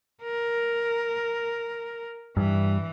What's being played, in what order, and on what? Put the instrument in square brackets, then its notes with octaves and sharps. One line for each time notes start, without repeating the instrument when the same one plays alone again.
[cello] A#4
[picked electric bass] G2 [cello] E3